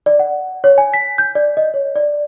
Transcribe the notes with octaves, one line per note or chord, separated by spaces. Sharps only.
D5
F#5
C#5
G#5
B6
G6
D5
D#5
C#5
D5